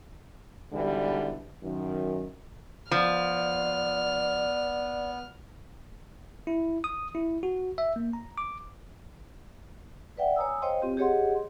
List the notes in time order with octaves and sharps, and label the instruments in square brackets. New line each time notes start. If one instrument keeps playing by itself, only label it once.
[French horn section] G#2 B2 D3 E3 G3
F#2 D#3
[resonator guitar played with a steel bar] F3 [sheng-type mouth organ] B3 [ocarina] D5 [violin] F6
[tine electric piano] E4
D#6
E4
F#4
E5
A#3
A#5
D6
[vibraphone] B4 D5 E5 F#5 G5
C#5 G#5 A#5 D#6 E6
C5 C#5 D#5 F5 G5 C6
C4 F4 G4
G4 G#4 C#5 D#5 F#5 C6